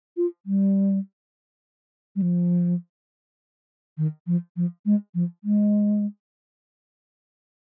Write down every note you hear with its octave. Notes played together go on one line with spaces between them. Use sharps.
F4
G3
G3
F3
D#3
F3
F3
G#3
F3
G#3